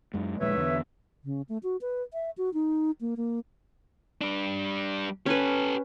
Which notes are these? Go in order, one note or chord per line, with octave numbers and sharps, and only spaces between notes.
F#2 G#3
D#1 A#1 G#3 B4 C#5 E5
E2 D3 B3
C#3
A3
F#4
B4
E5
F#4
D#4
A#3
A#3
G3 D4
C#4 G4 A4 B4